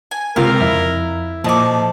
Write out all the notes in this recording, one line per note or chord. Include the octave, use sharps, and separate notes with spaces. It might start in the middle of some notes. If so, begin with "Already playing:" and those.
G#5
C#2 C3 F4 A#4 F5
F2 E4
A#2 F3 A3 D#5 D6